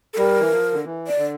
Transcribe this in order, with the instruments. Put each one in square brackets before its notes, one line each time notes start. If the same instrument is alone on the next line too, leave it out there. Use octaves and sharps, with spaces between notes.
[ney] A4
[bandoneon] G3 [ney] A#4
[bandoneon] E3
F3
D3
E3
[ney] D5
[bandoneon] D3